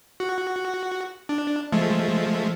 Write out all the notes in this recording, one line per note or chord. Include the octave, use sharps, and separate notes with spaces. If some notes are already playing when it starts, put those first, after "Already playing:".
F#4
D4
F3 G#3 A3